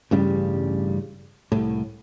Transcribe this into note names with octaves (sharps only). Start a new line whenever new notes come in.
A1 G2 C#3 G3
C2 A2